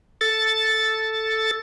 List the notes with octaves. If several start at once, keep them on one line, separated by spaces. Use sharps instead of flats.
A4 A6